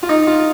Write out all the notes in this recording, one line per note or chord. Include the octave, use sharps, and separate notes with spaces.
F4
D#4
F4